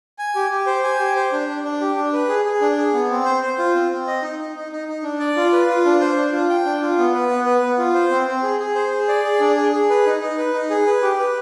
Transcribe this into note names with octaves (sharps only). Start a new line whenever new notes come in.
G#5
G4
G4
C5
G#5
G4
C5
D4
D4
D4
G4
D4
B4
G#4
G#4
D4
G#4
B3
C4
C5
C5
F4
C4
C4
D#5
D#4
D#4
D#4
D#4
D#4
D4
D5
F4
B4
F4
D4
C5
D4
F4
G5
D4
F4
B3
B4
B3
B4
B3
F4
C5
C4
C4
G#4
G#4
C5
G#4
D5
G#4
D4
G#4
G#4
B4
D#4
D#4
B4
D#4
G#4
B4
G4
B4